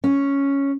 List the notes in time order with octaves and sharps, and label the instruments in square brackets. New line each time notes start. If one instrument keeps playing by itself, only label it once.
[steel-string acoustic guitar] C#4